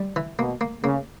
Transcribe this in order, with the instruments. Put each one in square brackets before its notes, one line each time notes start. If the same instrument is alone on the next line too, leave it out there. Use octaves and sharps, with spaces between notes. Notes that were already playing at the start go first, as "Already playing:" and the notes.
Already playing: [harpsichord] G3
E3
[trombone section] B2 [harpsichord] A#3
[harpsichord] A#3
[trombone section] C#3 [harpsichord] A#3